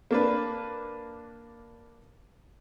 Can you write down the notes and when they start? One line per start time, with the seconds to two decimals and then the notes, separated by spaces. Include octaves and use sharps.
0.11 A#3 D4 B4